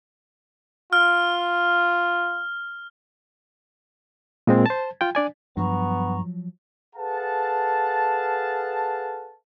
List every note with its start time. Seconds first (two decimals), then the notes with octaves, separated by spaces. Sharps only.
0.93 F4 F6
4.47 A#2 G#3 C4
4.66 C5 A5
5.01 F4 G5
5.15 D4 D5 G#5
5.57 G2 F3 F#3 B3 A#5 C#6
6.96 G#4 A4 B4 F5 F#5 A5